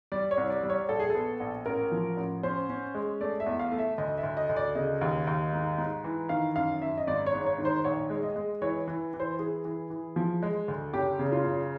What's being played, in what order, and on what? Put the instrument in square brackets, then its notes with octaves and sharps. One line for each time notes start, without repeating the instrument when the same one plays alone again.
[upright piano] G3 D5
C#5
C2
D5
G3
C#5
A#1 A4
G#4
B3 A4
A#1
A1 A#4
F3
A1
C#4 C5
C#4
G#3
A3 D5
E5
E2
F5
A3
E5
D2 D#5
E5
D2
D#5
D2
D5
C#3 D#5
D#2
D#2
G#2
G#2
E3
D#3 F5
F#2 F5
F#2 E5
D#5
G#1 D5
C#5
G#2
C#5
D#3
C5
A#1 C#5
G#3
D#5
G#3
E3 C#5
E3
E3
C5
E3 G#4
E3
E3
F3
G#3
D2
F#1 G4
C#3
F4
F#1